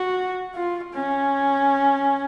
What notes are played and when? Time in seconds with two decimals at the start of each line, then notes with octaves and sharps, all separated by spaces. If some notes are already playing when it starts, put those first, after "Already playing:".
Already playing: F#4
0.54 F4
0.93 C#4